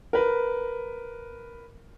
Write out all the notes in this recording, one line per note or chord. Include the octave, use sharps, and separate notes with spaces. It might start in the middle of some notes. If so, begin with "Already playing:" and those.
A#4 B4